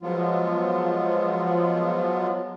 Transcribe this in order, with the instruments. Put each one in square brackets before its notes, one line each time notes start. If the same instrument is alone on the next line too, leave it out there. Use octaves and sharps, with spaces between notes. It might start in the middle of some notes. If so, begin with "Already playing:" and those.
[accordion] F3 F#3 G#3 B3 F4